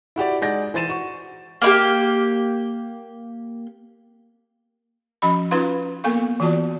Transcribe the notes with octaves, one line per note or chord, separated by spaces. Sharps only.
E4 F#4 G4 D5
G#3 D#4 D5 F#5 G6 A#6
E3 C5 A6 D#7 E7
F#4 C#6
A#3 E4 G4
F3 C#4 F#4 D#5 B5
C#4 D#4 F4 B4 F5 C6
A#3 B3 A4 A#4 F5 C#6
E3 B3 F4 F#4 D5 A5